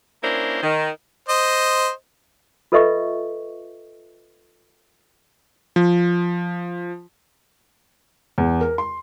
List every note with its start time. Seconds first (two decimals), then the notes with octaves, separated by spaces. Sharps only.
0.23 A#3 C#4 D4 E4 A#4 C5
0.63 D#3
1.29 C5 D#5
2.72 F4 A4 B4 D#5 E5 C#6
5.76 F3
8.38 E2
8.61 A#4
8.78 C6